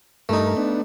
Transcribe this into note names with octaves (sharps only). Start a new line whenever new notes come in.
G2 A3 D#4 A#4
B3 D4